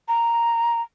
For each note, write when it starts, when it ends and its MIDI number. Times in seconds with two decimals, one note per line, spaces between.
0.08 0.81 82